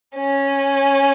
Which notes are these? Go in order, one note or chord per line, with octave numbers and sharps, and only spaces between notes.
C#4